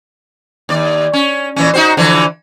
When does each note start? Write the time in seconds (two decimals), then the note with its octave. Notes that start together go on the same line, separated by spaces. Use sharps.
0.69 D#2 D5
1.13 C#4
1.56 A#2 E3 C#4
1.74 D#4 F#4 C5
1.97 D3 E3 F3